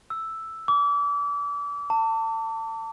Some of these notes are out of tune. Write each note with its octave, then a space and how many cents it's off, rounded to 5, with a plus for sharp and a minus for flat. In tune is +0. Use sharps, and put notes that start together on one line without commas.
E6 +0
D6 -35
A5 +30